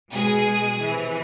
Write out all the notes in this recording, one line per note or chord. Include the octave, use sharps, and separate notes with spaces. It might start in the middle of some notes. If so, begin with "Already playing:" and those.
B2 G#3 G#4
C3 E3